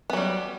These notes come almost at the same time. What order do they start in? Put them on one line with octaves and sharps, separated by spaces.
B3 F#3 G3